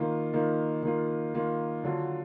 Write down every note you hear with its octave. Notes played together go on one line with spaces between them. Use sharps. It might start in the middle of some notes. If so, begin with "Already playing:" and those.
Already playing: D#3 A#3 F4
D#3 A#3 F4
D#3 A#3 F4
D#3 A#3 F4
D3 F#3 D4 F4